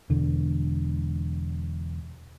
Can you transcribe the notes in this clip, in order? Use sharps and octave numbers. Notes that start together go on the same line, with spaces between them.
E1 D3